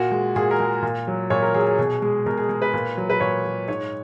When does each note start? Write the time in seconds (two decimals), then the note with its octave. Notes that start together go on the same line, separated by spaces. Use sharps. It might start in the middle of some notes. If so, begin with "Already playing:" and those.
Already playing: A#2 F#4
0.11 G#3
0.36 A#2 G#4
0.51 A#4
0.60 G#3
0.82 A#2
1.07 F#3
1.30 A#2 C#5
1.43 A#4
1.54 F#3 G#4
1.66 G#4
1.79 B2 G#4
2.02 G#3 G#4
2.26 B2 A#4
2.37 G#4
2.49 G#3 G#4
2.62 B4
2.73 A#2
2.97 F#3
3.10 B4
3.20 A#2 C#5
3.44 F#3
3.68 G#2 C#5